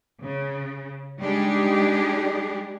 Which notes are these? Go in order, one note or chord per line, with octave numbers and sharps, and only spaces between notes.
C#3
G3 G#3 D4 D#4 G4 G#4